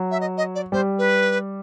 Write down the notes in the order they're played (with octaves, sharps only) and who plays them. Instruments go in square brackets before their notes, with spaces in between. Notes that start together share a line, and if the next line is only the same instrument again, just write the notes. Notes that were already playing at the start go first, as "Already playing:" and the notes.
Already playing: [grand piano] F#3
[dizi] E5
D#5
D#5
D5
[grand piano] G3 [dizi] C5
[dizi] B4